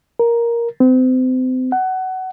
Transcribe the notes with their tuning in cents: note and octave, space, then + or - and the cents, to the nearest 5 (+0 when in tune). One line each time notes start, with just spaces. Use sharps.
A#4 +5
C4 -35
F#5 +20